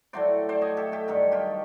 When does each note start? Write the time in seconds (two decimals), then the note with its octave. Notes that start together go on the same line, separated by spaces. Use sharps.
0.13 A2 F#3 A3 C5 D5
0.49 C5 D5
0.62 C#5 D#5
0.77 G4 A4
0.92 G4 A4
1.08 G2 D#3 F#3 G4 A4
1.32 F4 G4